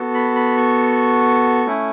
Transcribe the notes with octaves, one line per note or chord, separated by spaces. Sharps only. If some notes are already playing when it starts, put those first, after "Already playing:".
Already playing: B3 F#4 A4
B5
B5
C#6
A3 C#4 E4